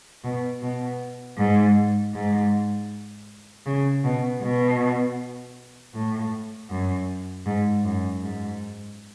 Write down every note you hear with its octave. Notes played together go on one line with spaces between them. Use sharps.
B2
B2
G#2
G#2
C#3
B2
B2
A2
F#2
G#2
F#2
G#2